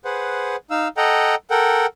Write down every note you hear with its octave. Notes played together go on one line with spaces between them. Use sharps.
G#4 B4 C5 F#5
D#4 F5 E6
A4 D#5 F#5 G5 A#5
A4 A#4 F#5 G5